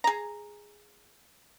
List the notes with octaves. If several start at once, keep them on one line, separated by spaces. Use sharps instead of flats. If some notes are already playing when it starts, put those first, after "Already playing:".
G#4 A#5